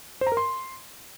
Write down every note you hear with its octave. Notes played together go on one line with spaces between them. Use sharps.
C5
A#5
A#4
C6